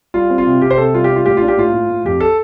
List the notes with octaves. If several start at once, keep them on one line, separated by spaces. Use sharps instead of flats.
G3 F4
C4
F4
C3
C3 G4
C5
C3 A4
G3 F4
G4
G3
F4
A2 G4
D4 F4
G4
A2 F4
A2
A2
F2 G4
A4